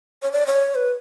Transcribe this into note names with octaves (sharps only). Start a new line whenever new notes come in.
C#5
D5
C#5
B4